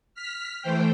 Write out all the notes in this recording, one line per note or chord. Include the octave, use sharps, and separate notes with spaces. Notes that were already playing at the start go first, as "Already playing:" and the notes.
F6 B6
E3 A3 C5 G5